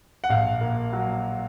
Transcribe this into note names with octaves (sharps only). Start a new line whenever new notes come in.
F#5
A#1 F5
A#3
F#3